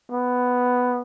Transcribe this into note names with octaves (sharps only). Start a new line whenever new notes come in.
B3